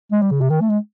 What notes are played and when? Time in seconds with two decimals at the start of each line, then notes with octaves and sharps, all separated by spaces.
0.12 G#3
0.22 G3
0.31 C#3
0.41 C3
0.50 D#3
0.60 A3
0.69 G#3